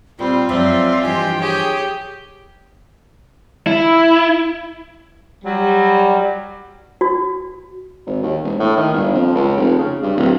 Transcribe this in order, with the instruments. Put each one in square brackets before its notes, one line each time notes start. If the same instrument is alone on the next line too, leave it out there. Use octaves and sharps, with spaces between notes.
[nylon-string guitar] A#2 [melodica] G3 [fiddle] C4 [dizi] F4
[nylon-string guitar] F#2 F3 G#3 [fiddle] C4 [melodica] D5 E5
[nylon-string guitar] G2 E3 F3 [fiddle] G4 [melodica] D#5 G#5
[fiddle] G4 [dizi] G#4 [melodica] C#5
[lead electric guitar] E4
[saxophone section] F#3 G3
[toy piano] F#4
[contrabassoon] G#1
D#2
E1
A2
D#3
G1
F2
C#2
F1
C#3
G2
D1